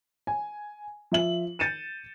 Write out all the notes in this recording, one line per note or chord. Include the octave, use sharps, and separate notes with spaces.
G#5
F3 E5 F#7
G6 A6 C#7 D#7 E7